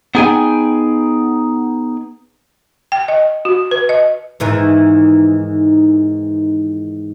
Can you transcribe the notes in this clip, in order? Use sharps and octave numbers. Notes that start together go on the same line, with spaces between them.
B3 D#4 G#4 G5 G#5
G5
D#5
F#4
B4
D#5
G#2 D#3 E3